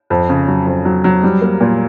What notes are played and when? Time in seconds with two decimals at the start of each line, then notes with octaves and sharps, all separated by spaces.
0.10 F2
0.29 C#3
0.48 F#3
0.67 F2
0.85 F#3
1.04 F#3
1.23 G3
1.42 A#3
1.60 A#2